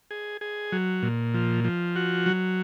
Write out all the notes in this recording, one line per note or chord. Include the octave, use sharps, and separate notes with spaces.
G#4
G#4
F#3
A#2
F3
F3
F#4
F#3